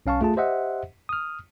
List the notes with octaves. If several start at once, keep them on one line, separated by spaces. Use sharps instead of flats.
B1 C#4 F5 A5 C#6
A3 F4 G#4 A5
G4 C5 D#5 E5 F#5
D#6 F6